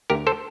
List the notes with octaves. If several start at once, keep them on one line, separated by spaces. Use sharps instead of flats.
D2 G4 A#4
A4 C5